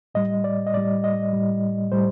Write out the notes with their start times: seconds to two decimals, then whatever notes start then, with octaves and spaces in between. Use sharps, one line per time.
0.15 A2 G3 D#5
0.44 D5
0.67 D#5
0.74 A2 G3 D5
1.04 D#5
1.33 A2 G3
1.91 A2 G3 C5